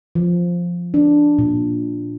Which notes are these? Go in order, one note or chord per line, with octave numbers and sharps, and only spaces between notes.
F3
D4
A#2